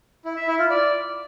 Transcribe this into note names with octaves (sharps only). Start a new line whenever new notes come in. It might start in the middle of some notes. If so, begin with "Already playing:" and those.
E4
E5
E4
F4
D5